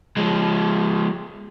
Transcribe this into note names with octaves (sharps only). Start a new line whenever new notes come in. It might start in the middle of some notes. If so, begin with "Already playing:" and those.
F3 G#3